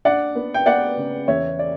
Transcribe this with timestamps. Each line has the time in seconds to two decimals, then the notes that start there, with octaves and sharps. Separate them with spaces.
0.05 D4 D5 F#5
0.35 B3
0.54 G5
0.66 B3 D5 F#5
0.97 C#3
1.28 E2 C#5 E5
1.59 D5